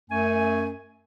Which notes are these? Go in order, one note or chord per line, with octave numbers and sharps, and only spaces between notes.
F#2 A3 G#5